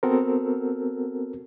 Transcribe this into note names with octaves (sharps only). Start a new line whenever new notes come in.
B3 C4 F#4 A4 A#4